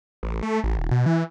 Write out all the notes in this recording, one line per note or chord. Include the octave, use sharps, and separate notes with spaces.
A1
A3
A1
D#1
B2
E3